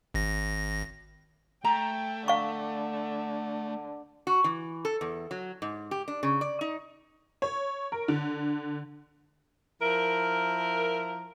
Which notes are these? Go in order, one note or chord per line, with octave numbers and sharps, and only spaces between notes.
G#1 A#6
A3 G5 A#5
D3 F5 C#6
F#4
E3
A4
E2
F#3
G#2
G4
D4
C#3
D5
D#4
C#5
A#4
D3
F3 E4 A#4